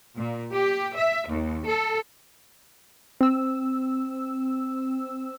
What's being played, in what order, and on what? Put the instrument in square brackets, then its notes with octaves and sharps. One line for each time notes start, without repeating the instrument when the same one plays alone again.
[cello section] A#2
G4
E5
D#2
A4
[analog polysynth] C4 E6